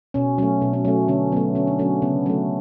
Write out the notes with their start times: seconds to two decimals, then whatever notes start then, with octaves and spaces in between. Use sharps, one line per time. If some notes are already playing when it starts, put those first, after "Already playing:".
0.14 B2 C#4
0.38 F#3 A3 C#4
0.62 B2
0.73 C#4
0.85 F#3 A3 C#4
1.08 D3 C#4
1.32 F#3 A3 B3
1.55 D3 C#4
1.67 D4
1.79 F#3 A3 C#4
2.02 C#3 B3
2.26 F#3 A3 C#4